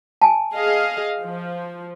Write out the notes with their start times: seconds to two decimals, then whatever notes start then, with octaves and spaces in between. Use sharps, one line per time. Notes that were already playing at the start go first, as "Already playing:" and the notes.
0.22 G#5 A5
0.54 G#4 D#5 F5
1.20 F3